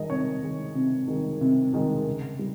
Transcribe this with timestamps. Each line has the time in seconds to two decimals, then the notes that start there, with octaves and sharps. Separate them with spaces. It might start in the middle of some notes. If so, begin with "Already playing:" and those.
Already playing: D#3 G#3 D#5
0.10 C3 C#5
0.43 D#3 G#3
0.75 C3
1.08 D#3 G#3
1.41 C3
1.74 D#3 G#3
2.07 C#3
2.39 G3